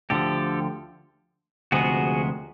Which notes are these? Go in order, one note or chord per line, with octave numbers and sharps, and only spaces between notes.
D2 D3 F3 G4 A4
D2 C3 F3 G#3 B3 F#4 G#4